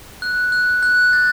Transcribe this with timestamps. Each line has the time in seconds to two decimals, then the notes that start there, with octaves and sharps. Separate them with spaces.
0.22 F#6
0.52 F#6
0.83 F#6
1.13 A6